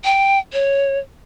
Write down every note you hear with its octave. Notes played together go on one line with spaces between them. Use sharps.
G5
C#5